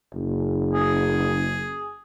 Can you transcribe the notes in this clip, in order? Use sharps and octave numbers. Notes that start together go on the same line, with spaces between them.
F#1
G#4